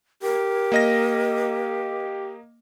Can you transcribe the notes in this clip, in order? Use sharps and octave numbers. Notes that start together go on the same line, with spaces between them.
G4 A#4
A#3 D#5 A#6